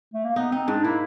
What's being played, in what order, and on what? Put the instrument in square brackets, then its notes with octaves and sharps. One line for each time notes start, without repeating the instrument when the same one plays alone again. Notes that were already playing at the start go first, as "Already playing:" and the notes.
[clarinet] A3
A#3
[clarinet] B3 [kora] D#4
[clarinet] C4 [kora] D#4
[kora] G#2 [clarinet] D4
[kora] A#3 [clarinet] E4